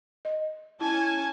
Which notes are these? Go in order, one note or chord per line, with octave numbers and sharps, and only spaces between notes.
D#5
C#4 E4 G#5 A5